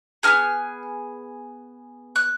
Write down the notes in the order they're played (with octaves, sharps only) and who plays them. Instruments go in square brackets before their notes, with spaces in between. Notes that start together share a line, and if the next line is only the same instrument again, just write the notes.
[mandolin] B3 D#4 G#4 F6
F#6